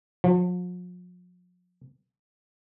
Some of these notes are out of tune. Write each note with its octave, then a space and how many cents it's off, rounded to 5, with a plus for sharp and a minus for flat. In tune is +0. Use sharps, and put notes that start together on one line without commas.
F3 +45